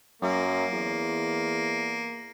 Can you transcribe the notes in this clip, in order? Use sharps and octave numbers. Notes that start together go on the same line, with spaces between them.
F#2 A#3
E2